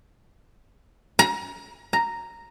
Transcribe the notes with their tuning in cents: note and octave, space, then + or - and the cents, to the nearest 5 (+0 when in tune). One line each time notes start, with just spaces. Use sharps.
A#5 +30
A#5 -5